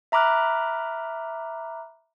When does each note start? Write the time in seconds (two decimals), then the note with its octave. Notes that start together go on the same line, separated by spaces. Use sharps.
0.12 E5 A#5 B5 D6 F6 F#6